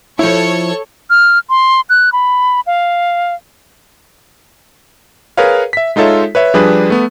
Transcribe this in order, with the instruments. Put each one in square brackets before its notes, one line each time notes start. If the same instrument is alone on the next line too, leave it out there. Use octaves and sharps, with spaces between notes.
[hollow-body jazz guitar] F3 E4 [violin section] A4 C#5 C#6
[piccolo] F6
C6
F#6
B5
F5
[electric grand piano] G#4 A#4 B4 C#5 F5
E5 B6
G#3 D#4 F4 A4 C#5 E5
B4 C#5 E5
F3 G3 D4 G#4 B4
A3 B3